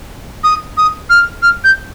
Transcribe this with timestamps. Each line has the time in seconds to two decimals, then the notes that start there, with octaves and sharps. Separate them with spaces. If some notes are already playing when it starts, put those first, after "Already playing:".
0.44 D#6
0.77 D#6
1.10 F6
1.43 F6
1.64 G6